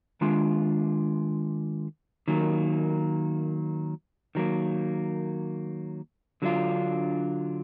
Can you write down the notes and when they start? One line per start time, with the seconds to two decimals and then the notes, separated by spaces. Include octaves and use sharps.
0.21 D#3 G#3 D4 F4
2.28 D#3 F#3 A#3
4.35 D#3 F#3 A#3
6.42 D3 F#3 D4 F4